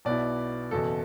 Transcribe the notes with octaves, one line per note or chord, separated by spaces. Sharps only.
B1 B2 B3 E4 D5
F#1 E2 B2 A4